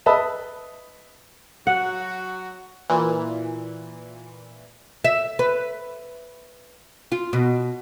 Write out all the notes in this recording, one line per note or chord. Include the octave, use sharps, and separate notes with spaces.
B4 D#5 E5 A5 B5
F#3 F#4 F#5
A#2 E3
E5
B4
F4
B2